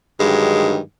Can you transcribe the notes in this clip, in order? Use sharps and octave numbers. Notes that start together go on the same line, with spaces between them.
G2 D3 D#3 F#3 G#3